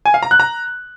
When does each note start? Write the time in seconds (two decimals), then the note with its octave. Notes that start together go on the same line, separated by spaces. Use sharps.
0.06 G#5
0.14 F5
0.23 A#5
0.31 F#6
0.40 A#5